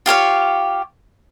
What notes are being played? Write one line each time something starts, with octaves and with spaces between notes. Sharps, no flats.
F4 G4 C#5 F5